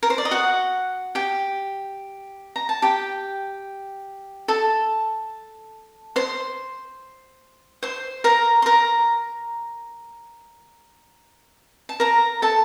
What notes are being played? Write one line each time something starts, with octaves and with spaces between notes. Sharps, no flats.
A#4
C5
D5
D#5
F#4 F#5
G4 G5
A#5
A5
G4 G5
A4 A5
C5 C6
C5 C6
A#4 A#5
C6
A#4 A#5
A5
A#4 A#5
A4 A5